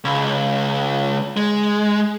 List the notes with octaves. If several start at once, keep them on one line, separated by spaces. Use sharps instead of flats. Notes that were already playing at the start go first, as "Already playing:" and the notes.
C#2
G#3